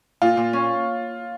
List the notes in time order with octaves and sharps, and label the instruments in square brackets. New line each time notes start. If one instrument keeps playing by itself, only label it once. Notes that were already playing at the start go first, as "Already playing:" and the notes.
[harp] A#2 [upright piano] F4
[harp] A#2
C#4